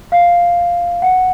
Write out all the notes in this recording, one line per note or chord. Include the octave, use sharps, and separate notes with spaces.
F5
F#5